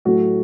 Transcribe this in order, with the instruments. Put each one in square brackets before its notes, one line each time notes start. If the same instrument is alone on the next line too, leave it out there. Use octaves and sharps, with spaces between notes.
[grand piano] A2 F#3 A3 F#4